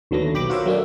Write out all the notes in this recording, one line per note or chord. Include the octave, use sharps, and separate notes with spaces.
D#2 D3 F#3 A3 B3 A#6
B1 G4 B5 D6
F4 F#4 A#4 C5 C#5 E5
F#3 A3 A#3 C#4 D4 E5